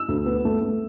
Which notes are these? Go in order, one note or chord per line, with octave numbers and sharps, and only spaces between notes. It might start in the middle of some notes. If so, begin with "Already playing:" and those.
Already playing: E6
D2
B3
A3
A3